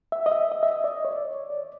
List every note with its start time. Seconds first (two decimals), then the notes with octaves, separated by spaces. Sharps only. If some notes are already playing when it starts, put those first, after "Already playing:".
0.12 E5
0.26 D#5
0.32 E5
0.52 D#5
0.63 E5
0.71 D#5
0.84 D5
0.90 D#5
1.05 C#5
1.11 D5
1.31 C#5
1.50 D5